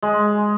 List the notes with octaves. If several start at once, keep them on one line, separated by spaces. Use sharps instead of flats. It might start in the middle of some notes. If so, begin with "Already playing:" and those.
G#3